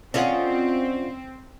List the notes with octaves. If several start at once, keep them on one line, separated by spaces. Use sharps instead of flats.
C4 C#4 F4 G#4 D5 D#5 F#5